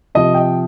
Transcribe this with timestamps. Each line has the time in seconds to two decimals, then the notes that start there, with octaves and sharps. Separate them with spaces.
0.15 C3 F3 D#5
0.34 G5